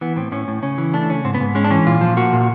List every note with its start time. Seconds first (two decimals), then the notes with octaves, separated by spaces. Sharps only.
0.01 E3 B3
0.16 A2 C4
0.32 A2 C#4
0.48 A2
0.63 C#3 C#4
0.78 E3
0.94 A3 D4
1.09 C#3 C#4
1.24 G#2 C4
1.34 B3
1.40 G#2
1.55 G#3 C#4
1.64 D4
1.70 E3 C#4
1.86 A#2 F4
2.01 F3
2.17 A#3 F#4
2.33 A#2